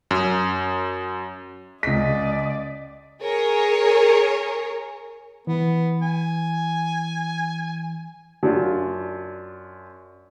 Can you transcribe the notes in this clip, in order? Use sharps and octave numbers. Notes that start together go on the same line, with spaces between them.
F#2
C#2 D5 D#5 B6
G#4 A#4 C#5
E3 B3
G#5
F#2 D4 F4